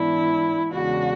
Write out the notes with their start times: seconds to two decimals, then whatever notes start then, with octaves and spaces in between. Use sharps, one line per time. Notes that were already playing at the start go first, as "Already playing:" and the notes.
Already playing: G#2 E3 B3 D4 E4
0.72 E2 C#3 G#3 D4 F#4